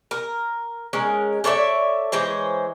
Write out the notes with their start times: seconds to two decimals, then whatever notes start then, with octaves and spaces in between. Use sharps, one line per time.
0.11 A#4
0.93 G#3 C#4 A#4
1.44 A4 C#5 D5 E5
2.12 E3 G#3 C5 C#5